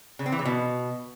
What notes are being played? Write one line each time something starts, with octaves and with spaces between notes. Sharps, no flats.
C#3
C4
E3
C#3
B2